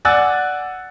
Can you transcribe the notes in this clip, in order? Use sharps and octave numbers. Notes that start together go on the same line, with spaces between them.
D5 F#5 G#5 E6 F#6 A6